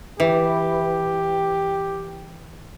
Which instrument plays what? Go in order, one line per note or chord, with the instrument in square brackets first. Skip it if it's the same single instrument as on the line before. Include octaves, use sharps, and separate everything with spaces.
[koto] E3 [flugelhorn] G4